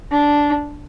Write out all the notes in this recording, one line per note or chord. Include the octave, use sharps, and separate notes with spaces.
D4